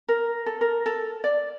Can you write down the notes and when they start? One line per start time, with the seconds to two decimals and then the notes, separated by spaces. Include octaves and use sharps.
0.08 A#4
0.46 A4
0.61 A#4
0.86 A4
1.24 D5